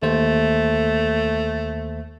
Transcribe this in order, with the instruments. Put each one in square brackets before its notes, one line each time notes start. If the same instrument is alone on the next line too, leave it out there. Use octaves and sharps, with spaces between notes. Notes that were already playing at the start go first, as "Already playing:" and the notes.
[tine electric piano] D#2 C5 [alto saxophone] A3